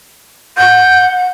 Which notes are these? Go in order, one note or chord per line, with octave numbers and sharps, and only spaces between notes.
F#5 G6